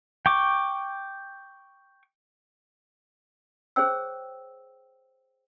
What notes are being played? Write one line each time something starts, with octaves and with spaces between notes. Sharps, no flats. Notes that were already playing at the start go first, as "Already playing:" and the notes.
G5 C#6 D6
G#4 C5 C#5 G5 E6